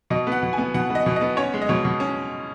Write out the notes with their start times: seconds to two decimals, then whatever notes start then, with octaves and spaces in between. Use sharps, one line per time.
0.10 B2 D#5
0.27 B3 F#5
0.43 B2
0.53 G#5
0.58 B3
0.74 B2 F#5
0.90 B3 D#5
1.06 B2
1.16 D#5
1.21 B3
1.37 C#4 C#5
1.54 G#3
1.61 D#5
1.69 B2 C#5
1.85 B2
2.00 C#4